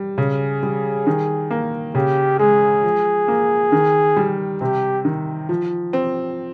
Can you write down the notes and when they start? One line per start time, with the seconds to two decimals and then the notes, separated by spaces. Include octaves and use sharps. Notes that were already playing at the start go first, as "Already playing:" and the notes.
Already playing: G3
0.18 C#3 G#4
0.63 G3
1.07 D#3
1.51 A#3
1.95 C#3 G4
2.39 G#3 G#4
2.83 F3
3.28 A#3
3.72 D#3
4.17 G3
4.61 C3 G4
5.05 D#3
5.49 F3
5.93 C4